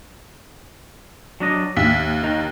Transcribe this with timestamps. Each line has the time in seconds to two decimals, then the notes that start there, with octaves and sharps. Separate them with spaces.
1.40 F#3 D4 D#5
1.77 D#2 E5
2.23 D#3 D#4